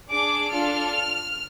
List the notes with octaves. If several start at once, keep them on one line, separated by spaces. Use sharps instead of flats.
D4 G#4 D6
D4 F4 A4 F6